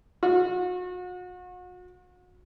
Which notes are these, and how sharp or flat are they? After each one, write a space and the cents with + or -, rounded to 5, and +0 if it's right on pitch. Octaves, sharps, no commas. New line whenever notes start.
F#4 -40